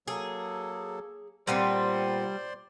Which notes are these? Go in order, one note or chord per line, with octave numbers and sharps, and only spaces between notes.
F#3 A#3 G#4 A4
A#2 G3 B3 C4 C5 D5 C6